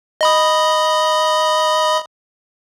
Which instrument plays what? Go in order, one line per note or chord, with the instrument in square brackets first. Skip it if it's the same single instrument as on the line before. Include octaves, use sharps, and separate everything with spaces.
[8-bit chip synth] D#5 B5 D#6